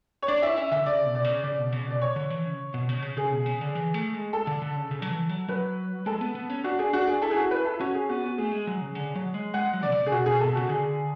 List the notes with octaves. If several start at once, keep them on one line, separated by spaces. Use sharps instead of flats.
C#5
D4 D5
E4 E5
C#4 E5
D3 E5
C#3 D5
B2
D5
C#3
C#3 D5
B2
C#3
B2 D5
C#5
D3
E3
C#3
B2
C#3
B2
C#3
C#3 G#4
B2
C#3
D3
E3
A3
G#3
A4
D3
D3
C#3
C#3
F#3
E3
F#3
F#3 B4
G#3 A4
B3
B3
C#4
D4 F#4
D4 G#4
D4 F#4
D4 G#4
E4 A4
G#4
F#4
B4
A4
C#4 F#4
G#4
B3 F#4
F#4
A3 G#4
G#3
F#3
C#3
D3
F#3
G#3
G#3 F#5
F#3
B2 D5
C#3
G#4
B2 F#4
G#4
B2 A4
C#3 F#4
D3 G#4